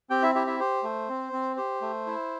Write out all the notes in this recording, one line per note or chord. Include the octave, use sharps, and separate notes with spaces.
C4 G4 G5
E4 E5
E4 G4 E5
E4 E5
G4 C5
A3
C4
C4
G4 C5
A3
E4